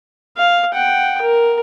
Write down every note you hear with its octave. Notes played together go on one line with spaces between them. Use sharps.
F5
F#5 G5
A#4